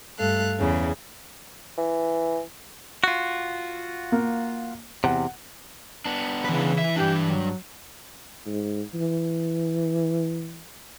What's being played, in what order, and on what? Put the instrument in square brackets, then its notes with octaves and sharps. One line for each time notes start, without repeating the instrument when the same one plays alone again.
[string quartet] G2 A3 A4 F5 F#6
E2 C#3 G#4
[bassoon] E3
[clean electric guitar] F4 F#4
[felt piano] A#3
[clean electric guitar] E2 C3 [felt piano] F#5
[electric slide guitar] B3 D4
[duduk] C#3 [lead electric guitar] E3 B4
[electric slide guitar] E5
[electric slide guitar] G2 F3 D4 [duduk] G4
[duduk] F#3
[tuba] G#2
E3